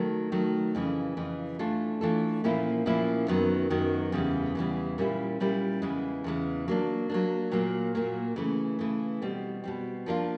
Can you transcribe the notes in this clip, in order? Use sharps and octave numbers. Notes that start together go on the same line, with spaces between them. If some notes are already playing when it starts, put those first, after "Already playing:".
Already playing: D#3 F#3 A3
D#3 F#3 A3
F2 C#3 E3
F2 C#3 E3
E3 A3 D4 F4 A4
E3 A3 D4 F4 A4
A#2 F3 A#3 C#4 E4
A#2 F3 A#3 C#4 E4
F#2 D#3 F#3 B3
F#2 D#3 F#3 B3
E2 C#3 E3 G3
E2 C#3 E3 G3
A#2 G3 A#3 C#4 E4
A#2 G3 A#3 C#4 E4
E2 C#3 E3 G#3
E2 C#3 E3 G#3
F#3 A#3 D4
F#3 A#3 D4
A#2 F#3 A#3
A#2 F#3 A#3
C#3 E3 A3
C#3 E3 A3
B2 G3 C4
B2 G3 C4
F3 A#3 D4 F4